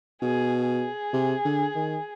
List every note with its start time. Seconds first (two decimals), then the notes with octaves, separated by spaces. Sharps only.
0.22 B2 G#4
0.67 G#4
1.13 C3
1.45 D3
1.75 D#3